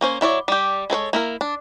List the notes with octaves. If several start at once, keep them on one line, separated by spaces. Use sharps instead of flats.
A#3 C#4 C5
F#3 E4 C#5 D5
G3 G4
G#3 A4 C5 C#5
A#3 E4 A#4
D4